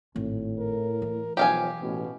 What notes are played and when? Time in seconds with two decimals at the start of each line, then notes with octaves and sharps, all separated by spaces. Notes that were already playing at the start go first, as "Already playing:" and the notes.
0.16 G#1 A2
0.59 A#4
1.02 E3
1.37 B1 F3 G4 F5 G#5
1.81 A1 B2